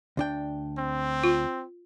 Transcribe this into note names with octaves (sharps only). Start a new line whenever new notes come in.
D2 D4 G5
C4
F4